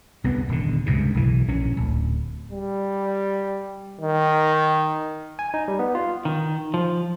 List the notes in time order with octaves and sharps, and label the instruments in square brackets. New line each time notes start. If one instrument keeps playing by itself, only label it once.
[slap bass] C2 G2 B3
D#1 D3
C#2 G2 C3
B1 E3
A#1 C#4
D1
[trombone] G3
D#3
[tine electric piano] G#5
D#4
G3
B3
F4
[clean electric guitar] D#3
F3